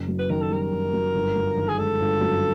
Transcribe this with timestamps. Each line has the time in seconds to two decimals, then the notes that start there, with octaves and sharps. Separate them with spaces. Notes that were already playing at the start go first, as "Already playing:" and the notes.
Already playing: F#1
0.08 F#2
0.19 B4
0.30 D#3 A#4
0.41 A4
0.51 G3 A#4
0.73 F#1
0.93 F#2
1.15 G1
1.36 F#2
1.57 D#3
1.68 G#4
1.78 G#3 A4
2.00 G1
2.21 F#2